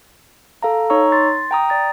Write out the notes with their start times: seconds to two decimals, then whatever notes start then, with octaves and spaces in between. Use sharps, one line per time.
0.63 A4 F5 A#5
0.90 D#4 C#5 A#5 C#6 E6
1.12 C6 A6
1.51 G5 A#5 D#6
1.70 D5 A6